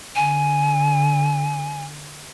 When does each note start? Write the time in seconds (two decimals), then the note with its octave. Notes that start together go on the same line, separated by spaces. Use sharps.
0.16 D3 G#5